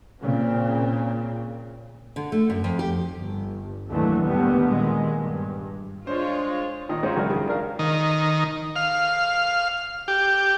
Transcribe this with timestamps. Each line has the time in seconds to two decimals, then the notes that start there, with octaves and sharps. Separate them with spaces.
0.21 A#2 C#3 C4
2.16 D3
2.32 A3
2.50 F#2
2.64 F2
2.79 G4
3.16 G1
3.89 D#2 A2 D3 E3 F#3 A3
4.24 D#2 A2 D3 D#3 G3 B3
4.67 A#2 D#3 G#3
5.18 G2
6.07 G#3 D4 F4 C5 C#5
6.89 A#2 D#3 D#5
7.03 G#2 C#4 F4 C5
7.16 C#2 F#2 D#3 F#4 A#4 D5
7.30 C#3
7.48 D4 A#4 F5
7.79 D#3
8.76 F5
10.08 G4